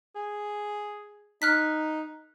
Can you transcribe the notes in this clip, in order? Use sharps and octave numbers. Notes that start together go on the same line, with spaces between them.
G#4
D#4 F6 F#6 B6